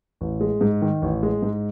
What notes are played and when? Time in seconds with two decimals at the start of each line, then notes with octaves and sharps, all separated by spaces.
0.21 A1
0.41 G#3
0.61 G#2
0.82 D#3
1.02 A1
1.23 G#3
1.42 G#2